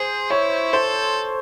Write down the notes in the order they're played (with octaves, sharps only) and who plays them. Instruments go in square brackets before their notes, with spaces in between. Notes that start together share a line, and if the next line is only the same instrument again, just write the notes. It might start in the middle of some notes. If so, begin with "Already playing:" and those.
Already playing: [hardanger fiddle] G#4 [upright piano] C5
[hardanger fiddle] E4 [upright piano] C#5
[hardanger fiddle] A4 [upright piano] C5